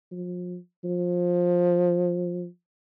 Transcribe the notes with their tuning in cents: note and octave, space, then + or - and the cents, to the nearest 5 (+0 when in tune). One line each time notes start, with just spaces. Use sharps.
F3 +35
F3 +15